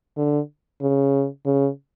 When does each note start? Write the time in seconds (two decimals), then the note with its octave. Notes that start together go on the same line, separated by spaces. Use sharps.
0.17 D3
0.81 C#3
1.46 C#3